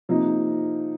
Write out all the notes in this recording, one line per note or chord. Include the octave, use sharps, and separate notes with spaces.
C3 F3 A#3 D#4